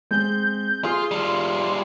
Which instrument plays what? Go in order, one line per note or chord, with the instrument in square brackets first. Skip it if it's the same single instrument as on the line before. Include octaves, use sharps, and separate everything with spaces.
[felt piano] G#3 C4 [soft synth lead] G6
[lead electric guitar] F4 [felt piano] G#4 [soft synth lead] C6
[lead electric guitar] G3 F4